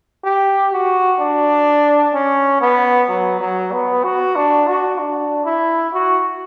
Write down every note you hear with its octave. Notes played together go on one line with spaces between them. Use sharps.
G4
F#4
D4
C#4
B3
F#3
F#3
B3
F#4
D4
F#4
D4
E4
F#4